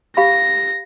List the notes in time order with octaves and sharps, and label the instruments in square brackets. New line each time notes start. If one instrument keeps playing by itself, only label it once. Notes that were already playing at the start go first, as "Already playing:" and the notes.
[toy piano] G4 F5 B5 [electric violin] A#6